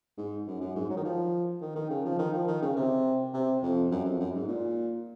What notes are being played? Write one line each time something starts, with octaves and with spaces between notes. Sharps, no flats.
G#2
F#2
F#2
G#2
F#3
D#3
F3
D#3
D#3
C#3
F3
D#3
F3
D#3
C#3
C3
C3
F2
F#2
F2
F#2
G#2
A#2